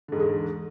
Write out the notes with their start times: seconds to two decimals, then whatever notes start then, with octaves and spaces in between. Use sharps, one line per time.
0.08 D3
0.12 G#2
0.16 E2
0.20 G#3